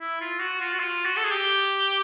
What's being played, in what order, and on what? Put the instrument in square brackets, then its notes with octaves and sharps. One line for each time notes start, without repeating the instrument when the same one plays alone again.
[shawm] E4
F4
F#4
F4
F#4
F4
F#4
A4
G#4
G4